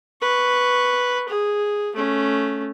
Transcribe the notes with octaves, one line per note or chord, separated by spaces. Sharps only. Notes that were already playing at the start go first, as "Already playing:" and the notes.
B4 C#6
G#4
A3 C#4